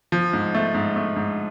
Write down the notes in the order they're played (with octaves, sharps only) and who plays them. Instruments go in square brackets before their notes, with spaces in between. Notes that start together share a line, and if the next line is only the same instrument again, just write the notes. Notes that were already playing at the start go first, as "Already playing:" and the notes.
[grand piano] F3
G#2
A3
G#2
A3
G#2